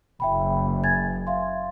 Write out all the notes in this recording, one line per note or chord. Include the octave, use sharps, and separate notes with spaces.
F#1 E5 G5 B5
G#5 G#6 A6
E5 F5 C6